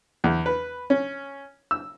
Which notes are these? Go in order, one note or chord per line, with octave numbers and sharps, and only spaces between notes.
E2
B4
C#4
E6